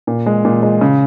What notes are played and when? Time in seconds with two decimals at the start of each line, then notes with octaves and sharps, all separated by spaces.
0.07 A#2
0.26 G#3
0.45 A#2
0.63 G#3
0.81 C#3